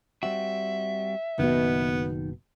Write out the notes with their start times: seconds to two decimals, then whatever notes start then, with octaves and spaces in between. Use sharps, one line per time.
0.23 G3 C4 F#4 E5
1.39 F#1 B2 D#3 B3